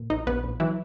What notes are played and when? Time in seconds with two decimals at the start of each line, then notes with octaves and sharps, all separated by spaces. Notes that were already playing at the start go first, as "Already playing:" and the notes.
Already playing: A#2
0.10 A#1 D#4 D#5
0.27 A#1 B3 B4
0.44 A#1
0.60 E3 F#3 E4